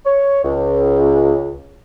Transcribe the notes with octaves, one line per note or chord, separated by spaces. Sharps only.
C#5
C#2